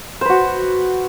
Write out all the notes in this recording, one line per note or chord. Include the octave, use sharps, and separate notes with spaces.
F#4 B4 C5